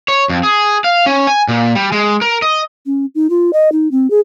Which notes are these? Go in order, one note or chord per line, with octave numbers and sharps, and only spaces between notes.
C#5
F2
G#4
F5
C#4
G#5
A#2
G3
G#3
A#4
D#5
C#4
D#4
F4
D#5
D#4
C4
G#4